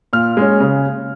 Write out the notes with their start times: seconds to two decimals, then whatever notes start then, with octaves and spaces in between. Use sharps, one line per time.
0.13 A#2 F6
0.37 G#3 C#4
0.60 C#3